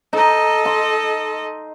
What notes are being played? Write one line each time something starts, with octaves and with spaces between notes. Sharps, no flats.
D#4 A4 D#5
C6